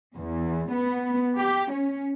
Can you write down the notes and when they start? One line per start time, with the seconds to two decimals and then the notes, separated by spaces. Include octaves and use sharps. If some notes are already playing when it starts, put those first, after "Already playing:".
0.16 E2
0.72 B3
1.38 G4
1.71 C#4